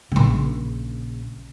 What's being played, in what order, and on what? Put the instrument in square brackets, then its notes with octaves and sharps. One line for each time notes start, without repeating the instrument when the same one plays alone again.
[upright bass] A#1 C#3